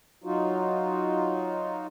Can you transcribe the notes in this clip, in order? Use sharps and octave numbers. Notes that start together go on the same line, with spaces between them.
F#3 D#4 F4 F#4